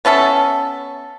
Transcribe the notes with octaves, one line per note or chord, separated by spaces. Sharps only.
B3 C#4 A4 E5